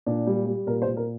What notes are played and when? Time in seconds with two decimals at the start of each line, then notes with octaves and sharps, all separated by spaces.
0.06 A#2 D4
0.27 G3
0.46 G3
0.67 A#2 A#4
0.82 C5
0.87 A#2
0.97 A#4